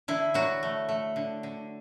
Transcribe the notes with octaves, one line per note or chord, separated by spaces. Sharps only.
D3 E4
F#3 F#4
A3
A3
D3
D3